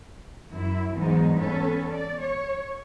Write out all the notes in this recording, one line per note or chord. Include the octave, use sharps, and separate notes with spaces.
F#2 E4
E2 G#2 F#3 G#3 B3 D#4
B3 C#4 A4 B4
D5
C#5